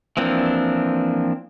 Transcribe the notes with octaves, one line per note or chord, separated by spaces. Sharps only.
E3 F3 A#3 C4 D4